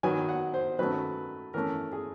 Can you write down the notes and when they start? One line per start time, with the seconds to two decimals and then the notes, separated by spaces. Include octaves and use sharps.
0.03 D#3 F#3 B3 G#5
0.29 F#5
0.54 C5
0.79 D#3 F#3 A3 C#4 B4
1.54 E3 A3 C#4 A#4
1.93 G#4